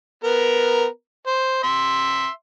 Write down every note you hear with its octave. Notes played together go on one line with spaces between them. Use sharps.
B3 A#4
C5
E5 C6